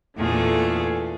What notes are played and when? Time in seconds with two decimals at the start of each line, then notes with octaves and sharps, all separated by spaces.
0.16 E2 A#2 D3 A3 G#4